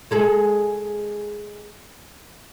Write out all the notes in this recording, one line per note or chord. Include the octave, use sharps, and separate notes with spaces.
G#3 G#4 A4